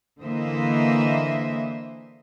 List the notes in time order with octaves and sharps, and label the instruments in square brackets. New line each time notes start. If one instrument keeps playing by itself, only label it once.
[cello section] D3 E3 A#3 C5 D#5 E5